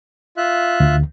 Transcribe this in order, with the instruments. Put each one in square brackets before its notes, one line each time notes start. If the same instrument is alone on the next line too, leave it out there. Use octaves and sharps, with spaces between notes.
[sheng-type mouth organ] F4 E5 F#6
[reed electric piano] D2